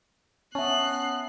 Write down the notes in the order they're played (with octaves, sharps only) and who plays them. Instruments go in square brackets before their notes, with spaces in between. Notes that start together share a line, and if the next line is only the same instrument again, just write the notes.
[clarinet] B3 [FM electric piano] C#4 [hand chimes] E5 A5 [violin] F#6 C7